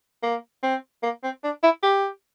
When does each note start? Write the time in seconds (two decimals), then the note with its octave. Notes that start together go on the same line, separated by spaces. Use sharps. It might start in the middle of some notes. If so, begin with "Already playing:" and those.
0.23 A#3
0.63 C4
1.03 A#3
1.24 C4
1.44 D4
1.63 E4
1.83 G4